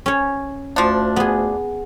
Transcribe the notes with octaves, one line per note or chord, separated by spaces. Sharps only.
C#4 C#5
D2 F3 D4
B3 G#4